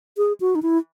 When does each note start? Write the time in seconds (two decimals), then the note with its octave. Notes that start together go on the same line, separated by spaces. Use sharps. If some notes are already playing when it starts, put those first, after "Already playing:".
0.17 G#4
0.40 F#4
0.55 D#4
0.62 E4